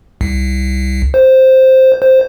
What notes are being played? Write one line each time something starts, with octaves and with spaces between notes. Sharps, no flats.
C2
C5
C5